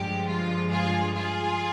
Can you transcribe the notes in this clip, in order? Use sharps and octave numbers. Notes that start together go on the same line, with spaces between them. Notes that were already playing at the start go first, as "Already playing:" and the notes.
Already playing: G2 D3 F3 G#3 G4
F4
F4 G#4
F4 G#4